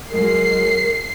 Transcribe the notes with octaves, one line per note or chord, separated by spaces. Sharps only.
F#3 G#3 A#4 C7